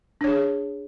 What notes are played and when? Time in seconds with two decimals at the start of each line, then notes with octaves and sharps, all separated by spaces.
0.21 D4
0.24 C#5
0.27 G#4